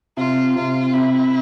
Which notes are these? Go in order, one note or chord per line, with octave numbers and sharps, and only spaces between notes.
C3 F4
C3 F4
C3 E4